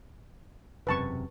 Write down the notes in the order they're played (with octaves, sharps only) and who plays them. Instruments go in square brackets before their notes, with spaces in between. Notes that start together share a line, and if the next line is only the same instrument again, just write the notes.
[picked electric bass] E1 F#2 C3 [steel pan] B4 A5 C#6